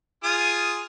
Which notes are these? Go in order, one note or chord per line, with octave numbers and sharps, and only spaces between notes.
F4 G#4 D#6